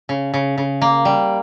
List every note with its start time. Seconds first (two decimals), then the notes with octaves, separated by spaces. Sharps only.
0.09 C#3
0.34 C#3
0.58 C#3
0.82 A#3
1.05 G3